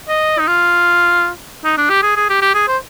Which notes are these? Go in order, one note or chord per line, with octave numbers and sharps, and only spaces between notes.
D#5
D#4
F4
D#4
D4
G4
G#4
G#4
G4
G4
G#4
C5